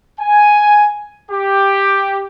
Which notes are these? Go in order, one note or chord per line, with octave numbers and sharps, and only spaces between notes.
G#5
G4